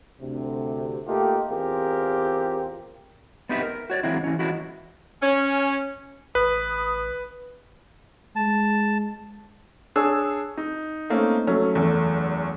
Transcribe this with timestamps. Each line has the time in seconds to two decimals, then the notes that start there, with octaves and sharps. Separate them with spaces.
0.21 D2 C3
1.07 A3 A#3 D#4 F4 G4
1.50 E2 C4 F4 G4 G#4 A#4
3.49 B3 C4 D#4 G4 B4 E5
3.63 A#4
3.90 F#4 C#5 D5
4.03 E3 F#3 G#3 A#3 C4 E4
4.24 E3 C#4
4.39 E3 F#3 G#3 A#3 E4 F#4
5.22 C#4
6.35 A1 B4 D#6
8.36 G#3 A5
9.96 D4 G#4 C#5 E6
10.58 D#4
11.10 A3 A#3 C4 C#4 D#4
11.47 F#3 A3 C#4
11.73 F#1 E2 A3